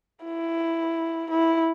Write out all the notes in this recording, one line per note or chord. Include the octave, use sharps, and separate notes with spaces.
E4
E4